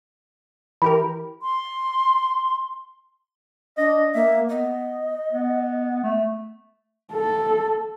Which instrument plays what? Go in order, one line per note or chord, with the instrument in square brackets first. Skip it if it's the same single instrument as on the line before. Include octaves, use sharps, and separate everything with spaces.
[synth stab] E3 G4 A#4 [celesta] B5
[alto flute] C6
[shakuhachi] D4 [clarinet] D#5
[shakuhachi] A#3 [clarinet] E5
[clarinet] B3 [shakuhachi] D#5
[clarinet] B3
A3
[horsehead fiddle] A4